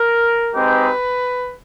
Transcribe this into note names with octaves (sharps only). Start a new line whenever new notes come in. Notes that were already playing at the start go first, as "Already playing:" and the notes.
Already playing: A#4
G#3 C4 D#4 G4 B4